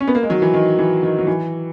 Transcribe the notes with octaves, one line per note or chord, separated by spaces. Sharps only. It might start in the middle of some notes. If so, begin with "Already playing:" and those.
C#4
B3
A#3
G#3
D#3 F#3
E3
D#3
E3
D#3
F#3
E3